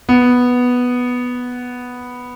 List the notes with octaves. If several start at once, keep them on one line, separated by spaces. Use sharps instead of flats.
B3